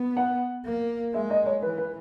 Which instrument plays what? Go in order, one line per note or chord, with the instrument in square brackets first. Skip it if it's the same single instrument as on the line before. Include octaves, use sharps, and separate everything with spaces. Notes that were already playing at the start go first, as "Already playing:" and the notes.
Already playing: [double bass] B3
[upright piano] F#5
[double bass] A#3
[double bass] G#3 [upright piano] E5
[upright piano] D#5
C#5
[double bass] E3 [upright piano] B4
[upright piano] B4